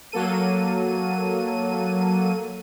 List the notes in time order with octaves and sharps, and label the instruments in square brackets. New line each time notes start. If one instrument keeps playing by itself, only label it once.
[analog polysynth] F#3 A#3 A4 D#7